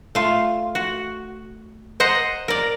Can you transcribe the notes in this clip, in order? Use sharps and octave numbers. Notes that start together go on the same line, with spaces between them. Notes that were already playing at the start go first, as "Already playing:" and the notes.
A3 F4
F#4
C5 D#5 F#5 A#5
A#4 D5